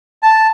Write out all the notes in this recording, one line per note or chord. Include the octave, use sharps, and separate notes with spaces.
A5